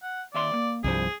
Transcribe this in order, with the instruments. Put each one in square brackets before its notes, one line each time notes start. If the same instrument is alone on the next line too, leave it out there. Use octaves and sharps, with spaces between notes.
[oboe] F#5
[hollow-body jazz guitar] D#2 E5 C6 [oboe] D5
[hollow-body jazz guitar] A#3
[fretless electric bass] C2 G2 F3 [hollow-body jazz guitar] C3 G3 C5 [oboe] G#4